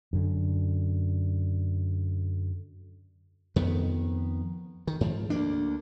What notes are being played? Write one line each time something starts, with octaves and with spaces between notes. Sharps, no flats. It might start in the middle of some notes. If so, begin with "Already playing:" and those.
F#2 D3
F2 D#3 B3
D#3
G#2 F3
D2 A#3 D4